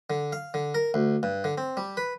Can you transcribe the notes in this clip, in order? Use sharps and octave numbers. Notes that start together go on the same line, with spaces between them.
D3
F5
D3
A#4
D2
G2
D3
C4
G3
B4